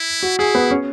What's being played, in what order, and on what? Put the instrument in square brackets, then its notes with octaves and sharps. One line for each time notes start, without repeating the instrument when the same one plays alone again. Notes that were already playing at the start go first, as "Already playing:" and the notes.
Already playing: [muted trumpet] E4
[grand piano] F#4
[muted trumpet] E4 [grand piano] G#4
[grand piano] B3 B4
C#4 C#5